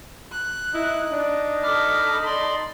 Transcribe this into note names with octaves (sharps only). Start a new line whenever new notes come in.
F#6
D#4 E4
D4
A4 B5 D6 F6
D5 C6